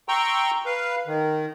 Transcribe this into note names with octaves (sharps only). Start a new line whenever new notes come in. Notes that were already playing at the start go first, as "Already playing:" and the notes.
G5 A#5 C6 C#6 E6
B4 F5
D#3